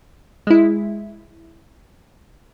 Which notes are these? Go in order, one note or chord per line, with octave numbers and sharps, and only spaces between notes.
G#3 E4